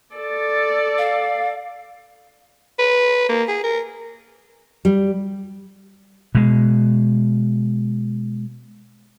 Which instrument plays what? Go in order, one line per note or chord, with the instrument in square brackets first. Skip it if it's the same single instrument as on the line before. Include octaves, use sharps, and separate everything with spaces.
[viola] A4 D5
[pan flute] F5
[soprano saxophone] B4
A#3
G#4
A#4
[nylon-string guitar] G3
[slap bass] B2 G#3